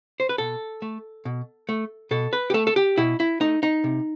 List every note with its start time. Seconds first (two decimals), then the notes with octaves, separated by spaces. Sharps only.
0.20 C5
0.29 B4
0.38 B2 A4
0.82 A3
1.25 B2
1.69 A3
2.11 B2 A4
2.33 B4
2.50 G4
2.54 A3 A4
2.67 A4
2.76 G4
2.98 B2 E4
3.20 E4
3.40 A3 D#4
3.63 D#4
3.84 C3